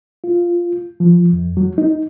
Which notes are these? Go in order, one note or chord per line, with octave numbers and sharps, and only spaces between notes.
F4
F3
F2
F#3
D#4